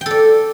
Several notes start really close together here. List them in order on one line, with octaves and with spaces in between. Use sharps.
G5 A4 D5